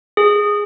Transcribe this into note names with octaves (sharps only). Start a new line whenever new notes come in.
G#4